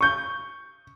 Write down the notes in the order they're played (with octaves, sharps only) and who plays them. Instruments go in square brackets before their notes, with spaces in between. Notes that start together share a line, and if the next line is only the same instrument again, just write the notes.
[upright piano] C#6 G6